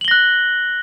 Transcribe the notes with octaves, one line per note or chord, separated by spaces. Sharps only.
F#6 A#6 F#7 G7